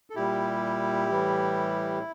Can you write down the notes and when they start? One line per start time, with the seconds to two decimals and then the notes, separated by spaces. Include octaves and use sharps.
0.10 A4
0.15 A#2 G3 E4 G4
1.09 A2 E3 G3